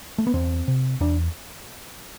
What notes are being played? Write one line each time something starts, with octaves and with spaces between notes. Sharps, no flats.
A3
B3
E2 C4
C3
E2 D4